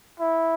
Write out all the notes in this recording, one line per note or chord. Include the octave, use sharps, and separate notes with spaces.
E4